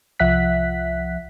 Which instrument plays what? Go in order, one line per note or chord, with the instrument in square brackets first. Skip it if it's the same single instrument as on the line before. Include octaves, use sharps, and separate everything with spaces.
[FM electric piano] C2 F3 E5 F#5 F#6 B6